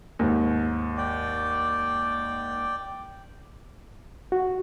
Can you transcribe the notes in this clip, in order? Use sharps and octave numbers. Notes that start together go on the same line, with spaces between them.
D#2 G#2
D5 G5
F#4